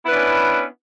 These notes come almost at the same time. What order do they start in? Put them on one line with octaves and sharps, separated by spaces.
B3 E4 B4 D4 C#4